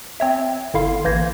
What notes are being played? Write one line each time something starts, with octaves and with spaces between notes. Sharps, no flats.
C4 C#5 E5
G1 D3 E4 F5 C6
A1 E3 A#3 G6 G#6 A#6